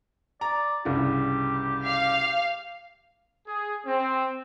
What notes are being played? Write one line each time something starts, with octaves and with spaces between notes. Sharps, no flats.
D5 A#5
C2 G2 C#3 G4
F5
G#4
C4